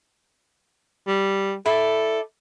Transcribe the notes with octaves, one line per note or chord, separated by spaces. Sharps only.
G3
E4 A4 D5